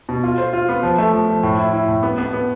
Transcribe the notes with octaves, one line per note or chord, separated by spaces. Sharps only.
B2
F4
C5
F4
B3
F3
A3
F3
F3
A2
E4
E4
A2
B3
B3
B3